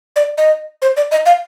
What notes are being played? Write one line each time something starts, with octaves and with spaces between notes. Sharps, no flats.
D5
D#5
C5
D5
D#5
F5